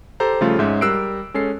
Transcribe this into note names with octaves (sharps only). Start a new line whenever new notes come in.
G4 A4 C5 A#5
C#3 F3 G3 A3 F4
G#2 G#3 C#4 E5 G6
G3 A#4 E6 F#6 C7 D7
G#3 C#4 A4 C7